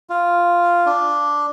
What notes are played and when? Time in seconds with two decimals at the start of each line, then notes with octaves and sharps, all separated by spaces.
0.10 F4
0.86 D4